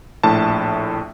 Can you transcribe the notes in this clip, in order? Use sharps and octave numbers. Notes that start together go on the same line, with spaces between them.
A#1 A2 A5